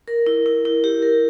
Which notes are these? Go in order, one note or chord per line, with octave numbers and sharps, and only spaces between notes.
A#4
E4
E4
E4
G4
A#4